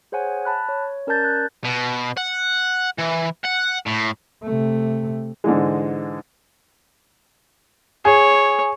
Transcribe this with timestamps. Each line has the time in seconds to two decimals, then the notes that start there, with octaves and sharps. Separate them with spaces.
0.12 G#4 C5 C#5 F#5 G#5
0.45 A5 B5 F#6
0.69 C#5
1.07 C#4 A#4 D5 A5 G6 A6
1.24 F#6
1.65 B2
2.17 F#5
2.99 E3
3.45 F#5
3.87 A2
4.44 C3 A3
5.44 G#2 D3 E3 G#3
8.05 G#4 C#5